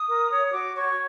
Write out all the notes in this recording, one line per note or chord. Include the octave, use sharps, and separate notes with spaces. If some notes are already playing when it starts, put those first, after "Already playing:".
Already playing: D#6
A#4
C#5
F#4 D6
C#5 C#6